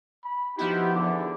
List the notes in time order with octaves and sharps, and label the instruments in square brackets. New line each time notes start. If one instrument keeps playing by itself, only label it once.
[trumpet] B5
[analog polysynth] F3 B3 E4 [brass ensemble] D#4 F#4 G4 [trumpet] B5
[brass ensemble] E2 D3 [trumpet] D6